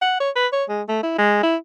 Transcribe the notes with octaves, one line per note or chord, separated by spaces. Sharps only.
F#5
C#5
B4
C#5
G#3
A3
E4
G#3
E4